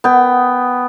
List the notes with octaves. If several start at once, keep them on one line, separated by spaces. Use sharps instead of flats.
B3 G5